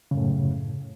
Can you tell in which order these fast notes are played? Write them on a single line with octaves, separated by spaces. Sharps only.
C#3 F#2 A2